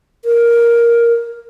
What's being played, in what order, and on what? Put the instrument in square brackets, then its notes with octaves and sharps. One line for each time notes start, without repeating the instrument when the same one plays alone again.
[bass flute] A#4